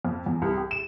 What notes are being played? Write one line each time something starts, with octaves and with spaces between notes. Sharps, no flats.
F2
E2
C2
G4
E7